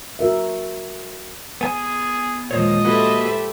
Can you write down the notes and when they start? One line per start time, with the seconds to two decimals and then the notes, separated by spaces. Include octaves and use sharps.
0.19 F#4 A#4 E5
1.61 B3 G#4 G#5
2.51 D#2 A#2 F3 G#3 C5 C#5 D#5
2.85 A#3 F#4 G4 A4 B4 C5 E5